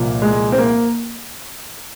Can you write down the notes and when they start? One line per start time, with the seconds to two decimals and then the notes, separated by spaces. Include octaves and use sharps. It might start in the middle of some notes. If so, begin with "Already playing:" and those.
Already playing: C2 A#2 F3
0.22 G#3
0.52 C4
0.58 A#3